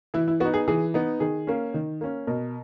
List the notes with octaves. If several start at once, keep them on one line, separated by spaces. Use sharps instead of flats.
E3 E4
E4
B3 D#4 F#4
G#4
E3 G#4
B3 D#4
D#3 G#4
A#3 C#4
D#3
A#3 C#4
B2 A#4